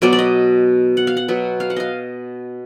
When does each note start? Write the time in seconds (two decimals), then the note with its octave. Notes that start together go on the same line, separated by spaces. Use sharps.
0.02 B2 F#3 B3 D5
0.13 D5
0.19 D#5
0.97 F#5
1.07 F5
1.17 F#5
1.28 B2 F#3 B3
1.60 F5
1.70 F#5
1.76 D#5 F5